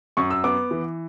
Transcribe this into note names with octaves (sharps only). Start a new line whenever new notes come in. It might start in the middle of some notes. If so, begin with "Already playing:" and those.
F#2 C#6
E6
B3 D6
E3